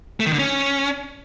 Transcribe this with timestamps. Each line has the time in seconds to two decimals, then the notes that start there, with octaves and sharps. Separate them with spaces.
0.20 A3
0.26 D#3
0.33 D3
0.39 C#4